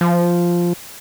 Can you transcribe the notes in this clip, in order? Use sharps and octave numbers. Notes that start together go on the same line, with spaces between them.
F3